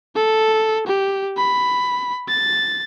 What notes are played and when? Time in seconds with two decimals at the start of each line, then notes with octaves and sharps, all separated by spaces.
0.16 A4
0.87 G4
1.38 B5
2.28 A6